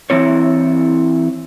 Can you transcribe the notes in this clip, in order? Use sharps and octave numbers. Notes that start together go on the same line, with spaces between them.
E3 C4 E4 C#5